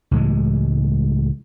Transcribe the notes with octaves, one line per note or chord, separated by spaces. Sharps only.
C#2 A2 E3 G#3